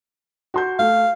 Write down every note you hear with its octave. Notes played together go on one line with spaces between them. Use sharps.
F#4 C6 G6
A3 F5